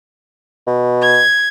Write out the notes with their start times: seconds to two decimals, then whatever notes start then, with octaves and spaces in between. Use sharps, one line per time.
0.67 B2
1.01 G#6